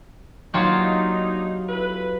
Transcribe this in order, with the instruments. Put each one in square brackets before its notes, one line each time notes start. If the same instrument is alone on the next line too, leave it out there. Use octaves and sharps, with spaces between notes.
[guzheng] F#3 F4 G4 [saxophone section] A#3 D4 D#4
[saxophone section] F2 E4 B4